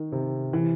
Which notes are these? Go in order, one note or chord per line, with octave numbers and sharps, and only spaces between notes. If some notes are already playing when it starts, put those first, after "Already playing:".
Already playing: D#3
C3
E3